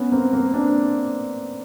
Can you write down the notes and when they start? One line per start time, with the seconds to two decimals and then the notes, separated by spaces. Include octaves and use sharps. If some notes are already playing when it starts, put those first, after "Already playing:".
Already playing: B3 C#4
0.12 A#3 C4
0.33 A#3 C4
0.54 C4 D4